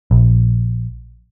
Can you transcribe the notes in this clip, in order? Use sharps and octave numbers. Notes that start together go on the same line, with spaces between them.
A#1